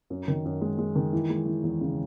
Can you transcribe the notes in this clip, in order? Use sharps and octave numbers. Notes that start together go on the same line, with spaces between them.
F#2
D#3
F#2
G#3
G#3
D#3
E3
G#3
E3
E2
C#3